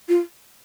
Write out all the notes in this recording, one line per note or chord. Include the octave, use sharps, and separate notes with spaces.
F4